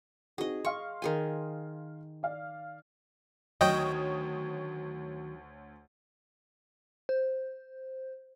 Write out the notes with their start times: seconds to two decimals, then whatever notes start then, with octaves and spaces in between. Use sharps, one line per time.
0.38 C4 D#4 F#4 G#4 D#5
0.65 F5 C6 C#6
1.02 D#3 G#4 G#5
2.23 D5 F5
3.61 D2 D#3 F#3 C#5 D#5 G5 D#6
7.09 C5